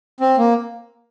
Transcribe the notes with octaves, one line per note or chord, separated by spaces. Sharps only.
C4
A#3